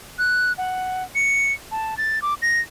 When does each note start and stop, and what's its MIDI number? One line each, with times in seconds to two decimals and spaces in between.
0.19 0.53 90
0.58 1.04 78
1.15 1.52 97
1.72 1.97 81
1.98 2.22 93
2.22 2.34 86
2.42 2.60 94